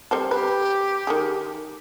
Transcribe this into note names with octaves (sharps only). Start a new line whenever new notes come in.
G3 C4 A4
G4 B4
D#3 A3 G#4